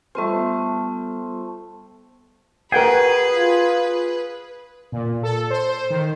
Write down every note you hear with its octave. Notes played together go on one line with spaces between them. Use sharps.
G3 A3 B3 F4 C5
F#4 G#4 A#4 B4 F#5 G5
F4
A#2
A4
C5
D#3